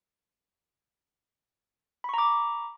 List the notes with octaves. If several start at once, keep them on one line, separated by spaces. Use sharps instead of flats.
A#5 B5 C#6 D6